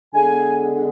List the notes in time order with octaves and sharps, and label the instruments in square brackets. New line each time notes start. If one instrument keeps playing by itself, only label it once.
[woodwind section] D3 G#3 B3 G#5